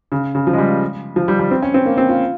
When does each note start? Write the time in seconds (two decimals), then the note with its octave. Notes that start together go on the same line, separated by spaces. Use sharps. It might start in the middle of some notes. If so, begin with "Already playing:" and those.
0.12 C#3
0.35 C#3
0.47 F3
0.53 G#3
0.58 G3
1.16 F3
1.28 G3
1.40 G3
1.51 C4
1.62 C#4
1.74 C4
1.86 A#3
1.98 C4
2.09 F4